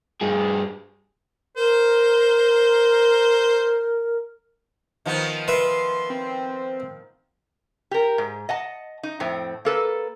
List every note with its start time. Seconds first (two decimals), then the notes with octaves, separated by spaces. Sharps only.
0.21 G2 G#4
1.56 A#4 C5
5.06 D#3 F3 B3
5.48 B4 E5 C6
6.10 C4
7.91 G4 A#4
8.18 G#2
8.49 D#5 F#5 A5
9.03 D#4
9.20 F2 A2 C4
9.65 A#3 A4 B4